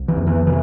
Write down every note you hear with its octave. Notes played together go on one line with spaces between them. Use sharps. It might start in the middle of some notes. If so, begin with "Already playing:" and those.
Already playing: C2
E3
F2
E3
C3 E3